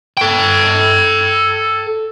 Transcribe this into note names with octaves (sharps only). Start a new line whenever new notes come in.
A4 G5